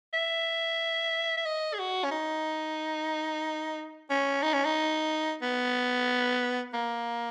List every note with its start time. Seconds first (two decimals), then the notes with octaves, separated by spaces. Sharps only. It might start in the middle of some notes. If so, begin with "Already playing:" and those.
0.14 E5
1.37 E5
1.46 D#5
1.74 G#4
1.79 F#4
2.04 C#4
2.11 D#4
4.10 C#4
4.43 D#4
4.54 C#4
4.65 D#4
5.42 B3
6.74 A#3